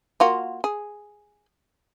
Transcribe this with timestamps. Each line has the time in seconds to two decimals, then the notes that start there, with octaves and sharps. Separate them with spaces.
0.20 A#3 F4 F#4
0.64 G#4